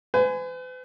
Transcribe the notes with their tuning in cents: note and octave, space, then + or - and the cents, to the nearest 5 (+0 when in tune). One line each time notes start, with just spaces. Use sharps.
B4 +45 G#5 +0